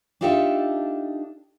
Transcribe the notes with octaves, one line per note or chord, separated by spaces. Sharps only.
D4 D#4 F4 G4 A4 E5